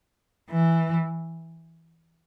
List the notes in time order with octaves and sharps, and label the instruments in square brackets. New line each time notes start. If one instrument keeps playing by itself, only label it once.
[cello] E3